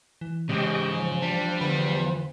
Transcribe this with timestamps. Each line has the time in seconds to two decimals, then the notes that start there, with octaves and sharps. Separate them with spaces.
0.21 E3
0.49 G#2 C#3 G4 D#5 G5
0.95 F3
1.22 G3 D4
1.61 E2 D3 B4